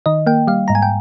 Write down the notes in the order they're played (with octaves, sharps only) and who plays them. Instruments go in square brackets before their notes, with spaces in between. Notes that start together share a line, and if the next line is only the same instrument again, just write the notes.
[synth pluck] D#3 D#5
A#3 G5
G3 F5
G#2 A#5
G#5
G5